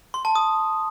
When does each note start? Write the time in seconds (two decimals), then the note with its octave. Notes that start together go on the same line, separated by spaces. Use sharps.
0.14 C6
0.25 A5
0.36 D#6